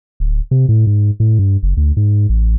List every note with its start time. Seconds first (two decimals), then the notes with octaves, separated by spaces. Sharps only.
0.20 D1
0.51 C3
0.69 A2
0.87 G#2
1.20 A2
1.39 G2
1.63 F#1
1.77 D2
1.97 G#2
2.29 A1